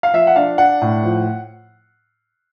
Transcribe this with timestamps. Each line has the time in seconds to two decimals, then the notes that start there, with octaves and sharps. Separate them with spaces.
0.03 F5
0.13 F3 E5
0.27 F#5
0.36 D4 F5
0.58 D4 F#5
0.81 A2
1.04 F3